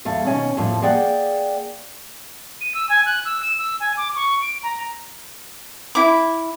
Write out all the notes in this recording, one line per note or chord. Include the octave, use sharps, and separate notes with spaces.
E2 A3 F5
B2 D#3 C#4 G#5
F2 A2 F3 A#3
A#3 G#4 D5 F#5 G5
D#7
E6
G#5
F#6
E6
E7
E6
G#5
D6
C#6
D7
A#5
E4 D6